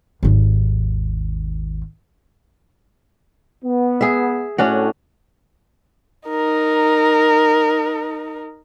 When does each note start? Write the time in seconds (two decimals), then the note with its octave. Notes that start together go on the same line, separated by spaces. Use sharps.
0.23 G#1 D#2
3.64 B3
4.01 G#4 E5
4.58 A2 C#4 D4 F#4
6.29 D#4 A#4